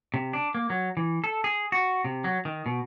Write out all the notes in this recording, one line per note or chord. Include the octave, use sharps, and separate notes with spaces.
C3
D4
A#3
F#3
E3
A4
G#4
F#4
C3
F#3
D#3
B2